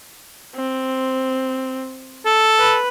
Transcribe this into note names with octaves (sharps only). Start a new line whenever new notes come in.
C4
A4
B4